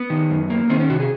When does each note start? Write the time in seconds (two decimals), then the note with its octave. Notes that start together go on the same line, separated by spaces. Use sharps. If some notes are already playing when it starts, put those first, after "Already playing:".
Already playing: B3
0.10 D#3
0.31 F#2
0.50 A#3
0.70 D#3 C4
0.80 C#4
0.89 C3 F#4
1.00 G#4